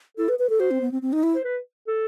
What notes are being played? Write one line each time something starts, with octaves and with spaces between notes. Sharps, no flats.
E4 A4
B4
B4
A4
F#4 C5
C4
B3
C4
C4
D#4
E4
C5
B4
A4